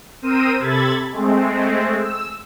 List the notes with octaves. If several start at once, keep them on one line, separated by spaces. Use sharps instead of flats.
C4 A#4 C5 D#6 E6 D#7
C3 A4 B5 G#6 A6
G#3 A3 C4
E6